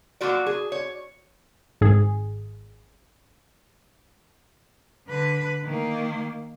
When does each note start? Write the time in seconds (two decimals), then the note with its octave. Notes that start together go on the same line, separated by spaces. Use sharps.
0.21 F#3 G3 A#3 F4 F#4 D5
0.47 G#4
0.72 C#5
1.81 G#1 G#4
5.08 D3 B4
5.64 D#3 A#3